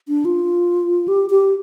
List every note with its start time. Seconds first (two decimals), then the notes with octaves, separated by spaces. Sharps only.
0.08 D4
0.25 F4
1.08 G4
1.30 G4